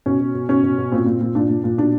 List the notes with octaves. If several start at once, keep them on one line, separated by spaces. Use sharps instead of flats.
B2 C#4
B2
B2
B2 C#4
B2
B2
A#2 C4
A#2
A#2
A#2 D4
A#2
A#2
B2 D4